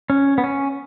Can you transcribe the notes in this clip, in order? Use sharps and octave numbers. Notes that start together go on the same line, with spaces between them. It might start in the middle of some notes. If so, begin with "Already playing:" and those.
C#4
B3
C#4